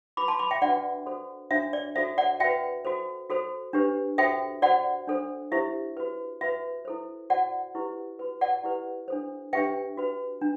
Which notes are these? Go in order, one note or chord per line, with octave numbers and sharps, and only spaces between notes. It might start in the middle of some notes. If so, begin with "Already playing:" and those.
F#4 B4 B5 D6
A5 C6
B5 D6
E5 G5
D4 F#4 B4 D5 F#5
F#4 A4 C5
D4 F#4 C5 E5
D5
F#4 A4 C5 E5
D5 F#5
F#4 B4 E5 G5
F#4 A4 C5
F#4 A4 C5
D4 G4 B4
F#4 A4 C5 E5 G5
F#4 C5 D5 F#5
D4 A4 C5
E4 G4 C5 E5
F#4 B4
F#4 B4 E5
E4 A4 C5
F#4 C5 D5 F#5
E4 G4 B4
F#4 B4
D5 F#5
E4 G4 B4
D4 A4 C5
D4 G4 B4 E5 G5
F#4 B4
D4